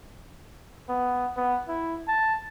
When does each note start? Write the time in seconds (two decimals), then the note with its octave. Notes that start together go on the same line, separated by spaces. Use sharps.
0.89 B3
1.37 B3
1.68 E4
2.08 A5